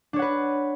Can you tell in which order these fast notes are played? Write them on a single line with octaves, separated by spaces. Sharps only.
D4 C#5 F#5 B4